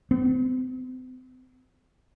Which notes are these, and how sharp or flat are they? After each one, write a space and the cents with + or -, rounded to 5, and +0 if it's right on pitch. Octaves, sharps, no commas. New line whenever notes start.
C4 -40